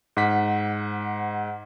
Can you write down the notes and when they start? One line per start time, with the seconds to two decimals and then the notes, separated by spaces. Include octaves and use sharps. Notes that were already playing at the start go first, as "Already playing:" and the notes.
0.17 G#2 F#5 B6